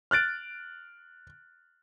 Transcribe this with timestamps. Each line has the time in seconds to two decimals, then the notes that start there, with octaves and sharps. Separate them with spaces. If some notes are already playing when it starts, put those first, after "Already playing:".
0.11 F6 F#6 A6 D7